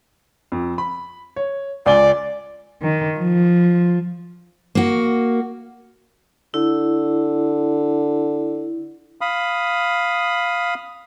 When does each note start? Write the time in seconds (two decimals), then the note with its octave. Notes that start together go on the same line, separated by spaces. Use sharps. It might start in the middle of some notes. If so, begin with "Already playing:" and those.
0.52 F2
0.78 B5
1.36 C#5
1.86 C#2 D5 G#5 G7
2.82 D#3
3.18 F3
4.75 A#3 F#4
6.54 D3 E4
9.21 F5 B5 D#6